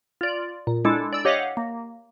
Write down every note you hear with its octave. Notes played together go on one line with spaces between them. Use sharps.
F4 D5
A#2
G#3 D4 E4 A4
D5 E6
G4 C#5 D#5 F5 F#5
A#3